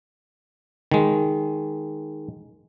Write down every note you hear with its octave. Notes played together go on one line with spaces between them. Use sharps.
D#3 G#3